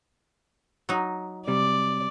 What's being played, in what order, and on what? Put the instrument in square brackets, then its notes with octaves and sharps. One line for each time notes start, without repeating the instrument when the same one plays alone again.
[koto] F#3 D#4
[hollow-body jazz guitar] C3 G3 [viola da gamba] D5